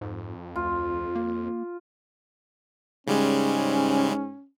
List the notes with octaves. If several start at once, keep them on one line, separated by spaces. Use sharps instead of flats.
F2 G#2
D2 F4
A#3
G#2 C#3 G3 G#3 C#4